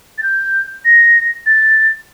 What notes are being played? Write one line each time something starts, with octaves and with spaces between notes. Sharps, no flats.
A6
G6
A#6
A6